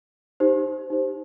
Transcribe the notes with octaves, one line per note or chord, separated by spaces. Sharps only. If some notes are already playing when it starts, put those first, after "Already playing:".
D#4 G4 C5
D#4 G4 C5